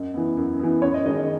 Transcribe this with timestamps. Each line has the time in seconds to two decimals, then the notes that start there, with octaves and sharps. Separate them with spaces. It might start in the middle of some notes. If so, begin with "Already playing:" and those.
Already playing: F#2 D#5
0.14 E3 B3
0.37 F#2
0.59 E3 B3
0.82 F#2 C#5
0.94 D#5
1.05 D#3 G#3 D#5
1.17 D#5